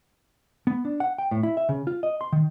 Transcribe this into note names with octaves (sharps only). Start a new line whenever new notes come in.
B3
D4
F#5
G5
A2
E4
E5
C#3
F4
D#5
C6
D#3